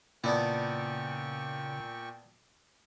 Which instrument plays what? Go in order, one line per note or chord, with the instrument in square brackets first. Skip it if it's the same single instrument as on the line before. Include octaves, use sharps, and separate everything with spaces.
[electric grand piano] A#2 [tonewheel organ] C#3 [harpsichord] B3 D4 E4 [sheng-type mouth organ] G5 C#6